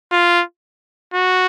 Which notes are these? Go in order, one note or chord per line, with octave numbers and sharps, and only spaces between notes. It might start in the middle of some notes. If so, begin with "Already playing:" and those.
F4
F#4